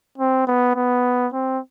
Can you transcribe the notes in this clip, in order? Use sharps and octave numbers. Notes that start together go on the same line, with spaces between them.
C4
B3
B3
C4